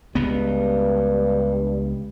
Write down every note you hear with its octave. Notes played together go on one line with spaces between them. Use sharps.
C#2 G2 B3